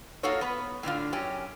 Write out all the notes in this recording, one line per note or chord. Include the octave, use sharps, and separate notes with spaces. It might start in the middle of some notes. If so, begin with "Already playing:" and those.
A#3 D#4 F4 F#4 A4 C#5
B3 B4
A2 D3 D4 F4
F#2 C#4 G4